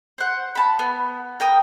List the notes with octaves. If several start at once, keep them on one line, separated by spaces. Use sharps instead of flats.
C5 F#5
A5 B5
B3
A#4 G5 D#6